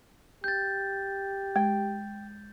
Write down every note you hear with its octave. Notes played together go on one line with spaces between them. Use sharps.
G4 G6 A6
G#3 G5